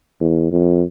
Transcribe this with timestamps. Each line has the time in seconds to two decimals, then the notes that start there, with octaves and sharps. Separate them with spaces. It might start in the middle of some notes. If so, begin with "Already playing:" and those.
0.21 E2
0.51 F2